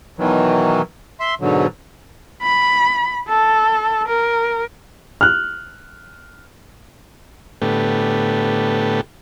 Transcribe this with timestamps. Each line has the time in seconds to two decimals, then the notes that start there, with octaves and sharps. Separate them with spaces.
0.18 B2 D#3 E3 F#3
1.20 E5 C6
1.41 G#2 B2 D3 F#3
2.42 B5
3.29 A4
4.08 A#4
5.21 F6 F#6
7.62 A2 D3 A3 B3 G4